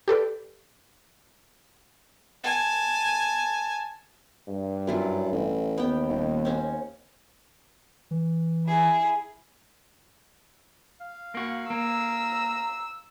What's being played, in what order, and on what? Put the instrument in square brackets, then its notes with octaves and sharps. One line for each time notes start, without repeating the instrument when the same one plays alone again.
[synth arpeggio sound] G4 A4 B4 D5
[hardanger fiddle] G#5 A5
[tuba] G2
[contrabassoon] F#2 [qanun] F#3 E4 F4
[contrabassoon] A1
[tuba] D#2 [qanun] B3 G5
[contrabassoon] D#1
[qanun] C4 C#4 F#4
[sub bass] E3
[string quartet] E4 G#4
[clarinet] F5
[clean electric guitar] A#3 F#4
[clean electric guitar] A#3 [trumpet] A#5 [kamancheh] E6